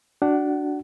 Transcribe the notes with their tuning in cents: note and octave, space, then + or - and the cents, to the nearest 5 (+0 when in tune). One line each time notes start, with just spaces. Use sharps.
D4 +0 F#4 +0 F#5 +30